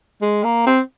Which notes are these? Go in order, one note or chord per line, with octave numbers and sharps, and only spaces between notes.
G#3
A#3
C4